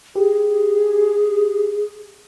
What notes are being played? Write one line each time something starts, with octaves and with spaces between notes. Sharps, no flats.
G4 G#4